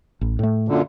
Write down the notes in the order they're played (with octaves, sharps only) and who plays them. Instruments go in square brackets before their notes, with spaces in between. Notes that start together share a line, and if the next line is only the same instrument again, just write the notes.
[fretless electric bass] A1
A2 A3
[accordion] F#2 A#2 D3